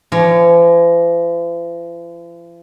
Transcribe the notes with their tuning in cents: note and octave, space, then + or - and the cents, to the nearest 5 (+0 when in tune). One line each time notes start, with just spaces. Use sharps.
F3 -45 C#5 +0